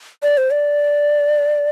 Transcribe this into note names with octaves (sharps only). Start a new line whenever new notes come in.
D5
C5
D5